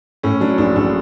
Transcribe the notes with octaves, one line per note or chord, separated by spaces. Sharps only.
A2 C#4
F#3 D4
A#1 D4
A#1 D4